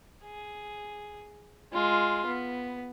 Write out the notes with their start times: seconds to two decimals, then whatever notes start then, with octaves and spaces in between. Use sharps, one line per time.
0.23 G#4
1.73 G#3 F4
2.26 B3